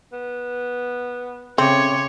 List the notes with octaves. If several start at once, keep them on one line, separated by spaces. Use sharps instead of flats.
B3
C#3 A3 C4 C#5 C6 D6